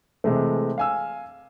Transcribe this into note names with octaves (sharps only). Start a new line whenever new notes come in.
C3 E3 G#3 A3
F5 G#5 E6